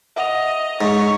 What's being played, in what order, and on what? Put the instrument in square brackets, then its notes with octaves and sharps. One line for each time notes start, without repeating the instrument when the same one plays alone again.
[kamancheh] D#5 [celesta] E5 F#5 F7
[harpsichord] G#2 [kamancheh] C#5